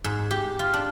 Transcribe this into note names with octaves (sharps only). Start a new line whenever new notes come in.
G#2
G4
F4
D4